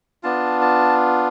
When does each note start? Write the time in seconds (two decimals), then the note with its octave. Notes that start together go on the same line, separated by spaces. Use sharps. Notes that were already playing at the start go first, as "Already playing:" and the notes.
0.23 B3 D4 F4 A5
0.61 A5